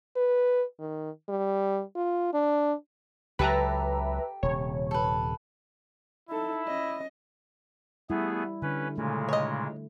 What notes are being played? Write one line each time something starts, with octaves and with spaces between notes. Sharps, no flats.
B4
D#3
G3
F4
D4
C#2 F#3 G4 A4 B4 E5 A5 A#5
D#1 C3 C#5
A4 B4
D#4 E4 A4
C#4 D#5
G3 A3 B3 E4 G#4
D3 C#4 B4
A#2 C#3 G#3 A3
C#5 D#5